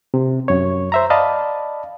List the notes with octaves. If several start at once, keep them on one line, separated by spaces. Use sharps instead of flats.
C3
F#2 C#5
C5 E5 A#5
D5 D#5 F5 A5 B5